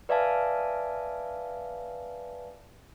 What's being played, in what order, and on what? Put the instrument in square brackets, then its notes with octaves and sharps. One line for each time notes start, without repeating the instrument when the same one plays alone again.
[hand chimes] B4 D5 E5 F5 G#5 A5